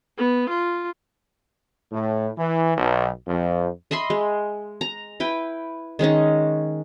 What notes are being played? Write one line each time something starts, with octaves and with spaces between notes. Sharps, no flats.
B3
F4
A2
E3
B1
F2
D#5 E5 B5 C6
G#3
A#5
E4 B4 G5
D#3 G#3 C#4 D#4